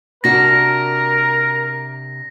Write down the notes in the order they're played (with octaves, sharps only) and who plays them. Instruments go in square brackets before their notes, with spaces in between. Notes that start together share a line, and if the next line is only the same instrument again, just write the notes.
[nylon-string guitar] C3 D4 F#4 [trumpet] A#4 [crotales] A#6